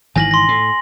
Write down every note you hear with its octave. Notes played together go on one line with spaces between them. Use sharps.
G#1 D#3 E3 G#5 A#6 F#7
C6 A#6
A2